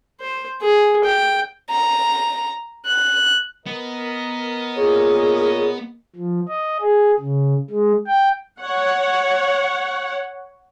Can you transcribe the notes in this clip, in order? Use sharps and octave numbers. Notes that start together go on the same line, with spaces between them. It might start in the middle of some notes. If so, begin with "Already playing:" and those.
C5
G#4
G5
A#5
F#6
B3 A#4 D#5
A#2 G#4 C#5
F3
D#5
G#4
C#3
G#3
G5
C#5 F#5